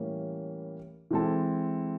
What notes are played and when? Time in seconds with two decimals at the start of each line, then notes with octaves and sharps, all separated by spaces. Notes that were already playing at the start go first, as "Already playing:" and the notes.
Already playing: A2 E3 G3 A#3 C#4
1.11 E3 G#3 C4 E4 A4